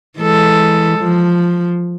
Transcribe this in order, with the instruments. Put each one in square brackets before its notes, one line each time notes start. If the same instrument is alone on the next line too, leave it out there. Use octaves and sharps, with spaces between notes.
[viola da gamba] E3 G#3 A4
F3